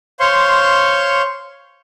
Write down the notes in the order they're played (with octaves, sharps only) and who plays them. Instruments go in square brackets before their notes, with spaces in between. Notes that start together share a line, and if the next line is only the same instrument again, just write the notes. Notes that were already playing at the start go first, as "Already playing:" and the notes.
[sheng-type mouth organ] C5 C#5 F5 C6 C#6